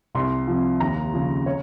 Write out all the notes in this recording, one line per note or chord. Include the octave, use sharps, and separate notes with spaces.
C2 C6
C3 F3
D#2 A#5
C#3 F3
C#5